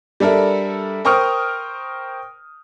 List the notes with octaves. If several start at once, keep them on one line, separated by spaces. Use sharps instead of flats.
G3 D4 A4 A#4 E5
A#4 C5 G5 C#6 D#6 F6